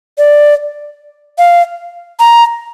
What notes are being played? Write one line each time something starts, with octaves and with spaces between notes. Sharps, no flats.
D5
F5
A#5